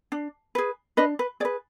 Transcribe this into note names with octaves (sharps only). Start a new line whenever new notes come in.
D4
G#4 B4
D4 B4 D#5
B4
G#4 B4 D5